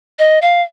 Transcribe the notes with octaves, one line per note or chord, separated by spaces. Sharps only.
D#5
F5